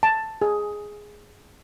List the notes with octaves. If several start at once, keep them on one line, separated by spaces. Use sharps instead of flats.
A5
G#4